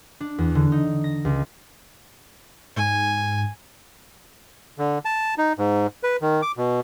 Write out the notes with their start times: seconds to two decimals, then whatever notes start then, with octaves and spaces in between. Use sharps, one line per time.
0.20 D4
0.38 E2
0.55 D3
0.72 D#4
1.04 A#6
1.25 C#2
2.76 G#2 G#5
4.78 D3
5.05 A5
5.38 D#4
5.58 G#2
6.03 B4
6.21 D#3
6.42 D6
6.57 B2